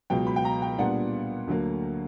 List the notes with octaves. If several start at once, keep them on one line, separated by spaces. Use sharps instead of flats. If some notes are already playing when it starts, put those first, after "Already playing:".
C#2 B2 F#3 G5
B5
G5
A#5
G5
A#2 G3 B3 D4 F#5
D2 D3 F#3 A#3